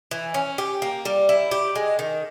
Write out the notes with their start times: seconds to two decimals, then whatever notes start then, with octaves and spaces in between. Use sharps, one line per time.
0.11 E3
0.34 C#4
0.58 G4
0.82 A#3
1.05 G3
1.29 E4
1.51 G4
1.76 G#3
1.99 D#3